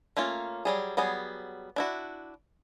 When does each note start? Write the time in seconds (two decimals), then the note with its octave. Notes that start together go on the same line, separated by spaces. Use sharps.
0.17 A3 A#3 C#4 F4
0.65 F#3 G3 G#4
0.97 F#3 G3 B3 G#4
1.76 D4 E4 F#4